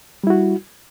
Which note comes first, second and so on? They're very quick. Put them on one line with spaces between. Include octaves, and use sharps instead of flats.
G3 E4 F#4